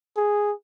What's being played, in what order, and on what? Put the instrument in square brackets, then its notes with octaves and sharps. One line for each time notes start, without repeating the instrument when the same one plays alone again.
[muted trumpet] G#4